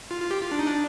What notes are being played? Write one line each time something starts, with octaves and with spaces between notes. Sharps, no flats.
F4
F4
G4
F4
D4
D#4
D4